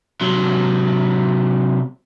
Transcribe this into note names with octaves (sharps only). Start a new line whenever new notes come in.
C3 F#3